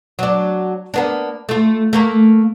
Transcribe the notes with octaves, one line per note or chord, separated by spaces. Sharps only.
F#3 D4
A#3 B3 D4
A3 F4
A3 A#3 A#4